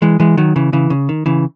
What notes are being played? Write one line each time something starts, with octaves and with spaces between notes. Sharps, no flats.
E3 G#3
E3 G#3
D#3 F#3
C#3 E3
C#3 E3
C#3
D#3
C#3 E3